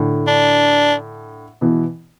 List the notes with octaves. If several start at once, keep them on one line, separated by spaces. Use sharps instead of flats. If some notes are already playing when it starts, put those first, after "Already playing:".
Already playing: A2 D3
D4
B2 E3